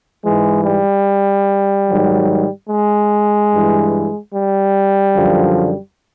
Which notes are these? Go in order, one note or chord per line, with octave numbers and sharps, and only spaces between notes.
G#2 E3 G#3
G3
G#2 D#3 F#3
G#3
G2 E3
G3
F#2 D3 F3